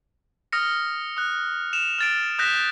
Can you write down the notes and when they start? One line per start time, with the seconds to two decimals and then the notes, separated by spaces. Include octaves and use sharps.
0.52 D#6 F6 A#6 C#7
1.17 D#6 F#6
1.73 E7 F7
1.98 F6 A6 D7
2.39 D#6 F#6 G6 A#6 B6 E7